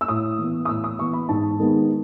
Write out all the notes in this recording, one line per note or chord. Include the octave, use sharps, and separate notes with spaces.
E6
A2 D#6
E3 B3
D#6
A2 E6
D#6
E3 B3 C#6
B5
G#2 A5
D#3 G#3 B3